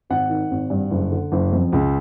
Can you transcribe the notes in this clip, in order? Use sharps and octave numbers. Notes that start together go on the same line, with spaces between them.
G#1 F#5
D#3
G#1
G2
F#1
D3
F#1
F2
C#2